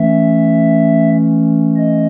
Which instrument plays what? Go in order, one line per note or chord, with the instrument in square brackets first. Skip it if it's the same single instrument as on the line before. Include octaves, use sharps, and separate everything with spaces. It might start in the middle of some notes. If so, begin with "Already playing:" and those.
Already playing: [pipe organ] E3 A3 C#4 E5
D#5